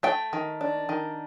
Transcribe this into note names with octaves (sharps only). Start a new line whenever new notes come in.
A3 G5
D#3
D4
D#3